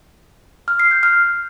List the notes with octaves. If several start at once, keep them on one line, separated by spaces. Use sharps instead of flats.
F6
C7
G6
F6